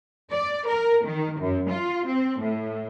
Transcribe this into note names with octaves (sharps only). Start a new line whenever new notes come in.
D5
A#4
D#3
F#2
F4
C4
A2